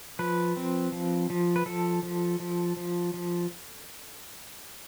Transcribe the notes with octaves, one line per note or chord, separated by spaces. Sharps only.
F3 B4
C4
F3
F3
B4
F3 A4
F3
F3
F3
F3